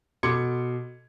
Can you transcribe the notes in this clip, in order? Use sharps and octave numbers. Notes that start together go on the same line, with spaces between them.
B2 A4 C6 D6 G#6 C#7